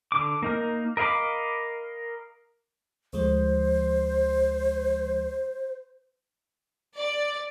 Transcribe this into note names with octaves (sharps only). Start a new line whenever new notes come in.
D3 D6
A#3 D#4 A#4
A#4 D#5 F5 B5 D6
D2 F3 G#3 C5
D5